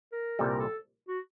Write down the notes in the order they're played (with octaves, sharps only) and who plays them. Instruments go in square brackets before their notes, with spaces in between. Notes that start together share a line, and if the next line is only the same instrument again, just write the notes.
[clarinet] A#4
[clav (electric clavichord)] C2 A#2 G3 [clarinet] A4
[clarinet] A#4
A4
F#4